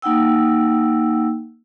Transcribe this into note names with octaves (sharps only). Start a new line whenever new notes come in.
A#3 D#4 F#5 G5 E6